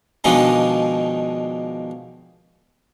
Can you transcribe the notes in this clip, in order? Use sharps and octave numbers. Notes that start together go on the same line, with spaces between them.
B2 D#3 F3 G#3 D4 D#4